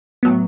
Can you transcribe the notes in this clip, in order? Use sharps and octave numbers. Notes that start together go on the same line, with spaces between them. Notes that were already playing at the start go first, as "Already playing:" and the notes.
A2 F#3 B3